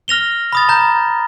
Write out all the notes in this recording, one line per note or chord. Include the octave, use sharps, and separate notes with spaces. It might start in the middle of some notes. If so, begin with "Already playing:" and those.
F6 A#6 F7 G7
B5 D#6 A6
A#5 G6